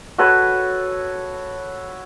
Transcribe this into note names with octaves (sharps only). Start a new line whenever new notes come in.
F#4 A4 B4 C#5